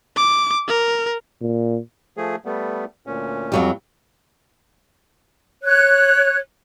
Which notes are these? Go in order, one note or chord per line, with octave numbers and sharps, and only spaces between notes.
D6
A#4
A#2
F3 A3 G#4
G3 A3 B3
D2 A#2 C#4
F2 F#3 G3
C#5 F#6